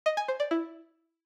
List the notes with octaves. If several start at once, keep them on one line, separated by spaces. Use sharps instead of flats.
D#5
G#5
C5
D5
E4